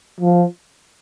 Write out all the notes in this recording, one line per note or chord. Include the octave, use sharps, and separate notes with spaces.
F3